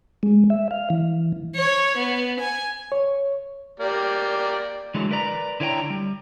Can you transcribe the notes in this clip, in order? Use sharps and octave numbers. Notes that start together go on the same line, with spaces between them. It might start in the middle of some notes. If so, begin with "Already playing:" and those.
G#3
E5
F5
E3
C#5
B3
G#5
C#5
A#3 G4 D5
D3 E3 F#3 G#3
A#4 B4 D5 A#5
D3 E4 C#5 G5 A#5
G3